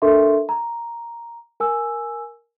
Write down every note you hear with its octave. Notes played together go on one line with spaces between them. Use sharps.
D4 A4 A#4 E5 C6 C#6
A#5
A#4 G#5 E6